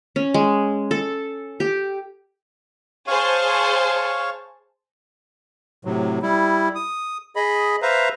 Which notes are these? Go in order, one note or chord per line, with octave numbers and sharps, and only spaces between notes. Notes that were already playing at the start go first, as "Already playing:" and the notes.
C#4
G#3
A4
G4
G#4 C5 C#5 F5 A5 C#6
A2 C3 F#3
G3 E4
D#6
G#4 D#5 B5
B4 C5 E5 F5 A#5